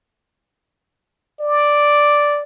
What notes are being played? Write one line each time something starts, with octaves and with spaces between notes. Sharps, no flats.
D5